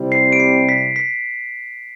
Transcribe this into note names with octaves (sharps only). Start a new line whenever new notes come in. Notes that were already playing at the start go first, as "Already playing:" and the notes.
Already playing: C3 G3 C4 E4
C7
D7
C7
B6
B6